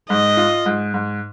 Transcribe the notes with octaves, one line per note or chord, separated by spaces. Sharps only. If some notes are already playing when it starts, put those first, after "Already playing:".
G#2 D#5
F4
G#2
G#2